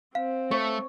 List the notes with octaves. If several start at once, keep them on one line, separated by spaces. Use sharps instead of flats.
C4 F5
A3 C#5